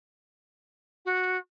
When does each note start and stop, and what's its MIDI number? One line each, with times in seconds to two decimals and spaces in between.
1.06 1.37 66